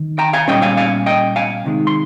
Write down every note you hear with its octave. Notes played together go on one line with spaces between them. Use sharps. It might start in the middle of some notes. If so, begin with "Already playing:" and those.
Already playing: D#3
G5 A#5
F5 G#5
A#2 G3 C#4 D#5 G5
F5 G#5
F5 G#5
D#5 G5
F5 G#5
C3 D#3 G#3
C6